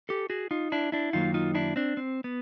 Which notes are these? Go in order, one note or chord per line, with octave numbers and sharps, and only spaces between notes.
G4 A4
F#4 G#4
D#4 F4
D4 E4
D4 E4
F#2 D#3 F#3 A#3 D#4 F4
D#4 F4
D4 E4
C4 D4
C4
B3